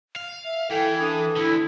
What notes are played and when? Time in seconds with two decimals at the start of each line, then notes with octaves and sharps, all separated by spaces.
0.16 F5
0.45 E5
0.70 E3 A4 G5 G#5
1.00 D4 A4 D#6
1.37 D2 D3 E4